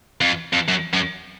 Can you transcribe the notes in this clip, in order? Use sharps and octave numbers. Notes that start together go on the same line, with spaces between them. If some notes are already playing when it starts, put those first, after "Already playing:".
F2
F2
F#2
F#2